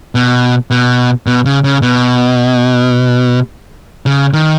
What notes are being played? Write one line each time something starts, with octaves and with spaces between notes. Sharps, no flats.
B2
B2
B2
C#3
C#3
B2
C#3
D#3